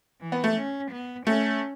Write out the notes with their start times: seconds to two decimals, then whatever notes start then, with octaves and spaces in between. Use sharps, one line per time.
0.21 E3
0.32 B3
0.44 A3
0.56 C#4
0.91 B3
1.26 A3 C#4